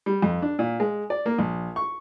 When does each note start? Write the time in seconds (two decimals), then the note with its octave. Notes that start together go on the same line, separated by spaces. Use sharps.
0.06 G3
0.22 F2
0.42 D4
0.59 A#2
0.80 G#3
1.10 D5
1.26 A#3
1.39 A#1
1.76 C#6